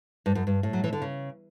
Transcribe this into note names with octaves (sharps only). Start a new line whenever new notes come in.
G2
F#2
G2
A2
F#3
E3
D3
C#3